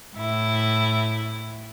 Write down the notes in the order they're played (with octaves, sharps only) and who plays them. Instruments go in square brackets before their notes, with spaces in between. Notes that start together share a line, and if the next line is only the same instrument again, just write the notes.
[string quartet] A2 E4